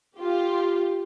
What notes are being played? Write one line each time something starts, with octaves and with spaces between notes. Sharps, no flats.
F4 G4